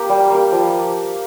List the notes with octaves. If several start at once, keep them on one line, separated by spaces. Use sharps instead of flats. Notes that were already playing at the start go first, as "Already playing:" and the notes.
Already playing: A#3 G4
G3
A#3 G4
F3